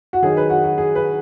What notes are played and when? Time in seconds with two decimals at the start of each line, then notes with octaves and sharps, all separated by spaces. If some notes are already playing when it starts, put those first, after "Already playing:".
0.13 F#4
0.22 D#3 F#3 D#4 G#4
0.37 B4
0.50 F#4
0.64 F#4
0.78 G#4
0.95 B4